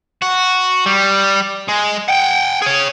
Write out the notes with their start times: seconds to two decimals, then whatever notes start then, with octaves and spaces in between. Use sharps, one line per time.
0.22 F#4
0.86 G3
1.68 G#3
2.09 F#5 G5
2.62 G#4 C#5